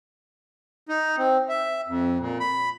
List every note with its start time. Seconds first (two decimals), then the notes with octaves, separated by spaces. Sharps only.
0.89 D#4
1.17 C4
1.49 E5
1.88 F2
2.19 A#2
2.40 B5